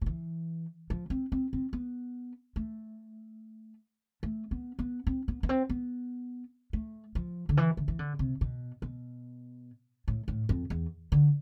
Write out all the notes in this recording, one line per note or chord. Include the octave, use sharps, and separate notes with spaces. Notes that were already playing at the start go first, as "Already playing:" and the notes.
F3
E3
F3
C4
C4
C4
B3
A3
A3
B3
B3
C4
B3
B3
C4
B3
A3
F3
D3
E3
D3
E3
D3
C3
B2
B2
A2
A2
F2
E2
D3